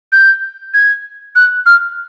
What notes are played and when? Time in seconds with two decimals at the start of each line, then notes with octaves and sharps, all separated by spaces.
0.12 G6
0.74 G#6
1.36 F#6
1.66 F6